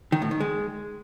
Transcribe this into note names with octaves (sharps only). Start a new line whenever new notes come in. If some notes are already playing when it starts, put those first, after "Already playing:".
D#3
A2
D#3
G#3